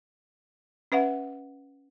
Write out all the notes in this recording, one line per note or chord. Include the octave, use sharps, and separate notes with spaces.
C#4 B4 E5 F#5